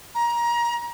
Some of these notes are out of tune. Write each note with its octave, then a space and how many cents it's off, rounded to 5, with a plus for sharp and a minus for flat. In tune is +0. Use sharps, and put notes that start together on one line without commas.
A#5 +25